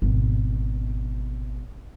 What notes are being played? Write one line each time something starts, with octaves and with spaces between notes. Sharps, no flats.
G#1 B2